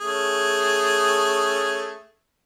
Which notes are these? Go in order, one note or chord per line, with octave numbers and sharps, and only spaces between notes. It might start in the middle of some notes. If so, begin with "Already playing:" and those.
A3 C#4 G#4